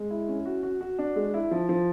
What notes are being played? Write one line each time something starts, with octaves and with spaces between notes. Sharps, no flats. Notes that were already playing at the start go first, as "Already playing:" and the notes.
Already playing: G#3
E4
C#4
F#4
F#4
F#4
D4
G#3
E4
F3
F3